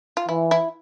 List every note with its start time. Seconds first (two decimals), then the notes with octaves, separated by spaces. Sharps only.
0.17 F4
0.29 E3 E4
0.51 E4